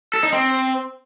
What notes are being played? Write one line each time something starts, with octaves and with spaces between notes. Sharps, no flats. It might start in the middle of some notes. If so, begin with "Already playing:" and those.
A4
D#4
C4